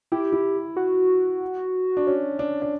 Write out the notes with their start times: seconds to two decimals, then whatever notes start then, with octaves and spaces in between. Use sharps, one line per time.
0.12 E4 G4
0.32 E4
0.76 F#4
1.97 D4
2.07 C#4
2.39 D4
2.62 D4